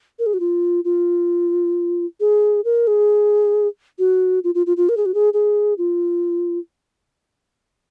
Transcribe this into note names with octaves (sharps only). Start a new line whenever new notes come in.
A#4
G#4
F#4
F4
F4
G#4
A#4
G#4
F#4
F4
F4
F4
F4
A#4
G#4
F#4
G#4
G#4
F4